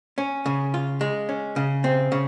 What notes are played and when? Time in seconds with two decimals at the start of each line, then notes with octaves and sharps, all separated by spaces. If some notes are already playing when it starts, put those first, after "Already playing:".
0.18 C#4
0.46 C#3
0.74 F4
1.01 G#3
1.29 C#4
1.56 C#3
1.84 C4
2.12 C#3